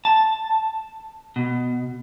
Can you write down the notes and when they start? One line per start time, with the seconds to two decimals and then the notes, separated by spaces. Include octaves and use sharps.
0.05 A5
1.36 B2